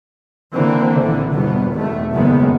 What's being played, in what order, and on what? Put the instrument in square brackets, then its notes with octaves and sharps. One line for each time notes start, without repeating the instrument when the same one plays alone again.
[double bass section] D3 E3 A#3 C4
A#1 D3 E3
G1 E2 B2 B3
G#1 E2 B2 A3
F#1 F#2 D#3 G#3 B3